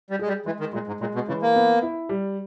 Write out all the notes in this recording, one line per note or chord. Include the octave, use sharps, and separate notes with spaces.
G3
G#3 G#4
G3
E3 G#3
D#3
A#2 G#3
G#2
A#2 G#3
B2
C#3 E3
A#3
B3
E4
G3